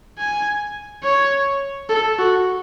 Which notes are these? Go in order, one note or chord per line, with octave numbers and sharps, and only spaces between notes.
G#5
C#5
A4
F#4